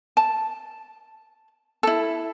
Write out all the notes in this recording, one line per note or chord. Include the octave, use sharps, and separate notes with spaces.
A5
E4 A4